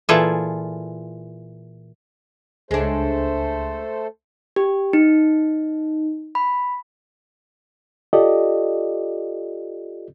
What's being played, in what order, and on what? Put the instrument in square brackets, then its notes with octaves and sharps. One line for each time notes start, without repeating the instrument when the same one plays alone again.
[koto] A#2 E3 F4 G#4 A4
[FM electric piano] C#2 [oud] G#3 D4 [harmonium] A3 A4 C5
[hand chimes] G4
D#4
B5
[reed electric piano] F4 G4 A4 D5 D#5